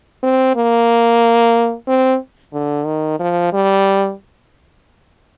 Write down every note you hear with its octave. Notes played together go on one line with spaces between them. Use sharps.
C4
A#3
C4
D3
D#3
F3
G3